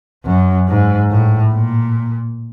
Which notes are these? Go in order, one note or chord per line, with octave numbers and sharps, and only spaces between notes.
F#2
G#2
A2
A#2